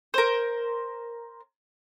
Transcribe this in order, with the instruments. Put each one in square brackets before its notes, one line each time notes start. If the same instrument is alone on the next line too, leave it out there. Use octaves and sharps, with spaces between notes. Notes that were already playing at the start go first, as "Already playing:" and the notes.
[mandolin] A#4 C5